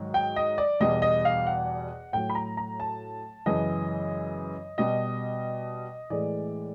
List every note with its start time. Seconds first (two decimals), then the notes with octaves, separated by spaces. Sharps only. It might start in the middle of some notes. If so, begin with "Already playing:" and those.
Already playing: G#2 D#3 F#3
0.14 G5
0.36 D#5
0.58 D5
0.80 E2 B2 G3 D#5
1.02 D#5
1.25 F5
1.47 F#5
2.13 A2 F#3 G5
2.30 B5
2.35 A#5
2.57 A#5
2.80 A5
3.46 F#2 C#3 E3 G#3 D#5
4.78 B2 G3 D#5
6.10 A2 E3 G#3 D5